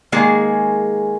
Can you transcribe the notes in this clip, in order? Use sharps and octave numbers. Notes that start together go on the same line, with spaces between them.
D#3 G#3 A#3 G#4